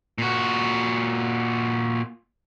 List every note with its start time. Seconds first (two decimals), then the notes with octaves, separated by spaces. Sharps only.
0.18 A#2 F#4